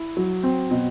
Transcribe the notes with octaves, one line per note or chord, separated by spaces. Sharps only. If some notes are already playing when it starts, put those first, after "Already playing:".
Already playing: E4
F#3
C4
B2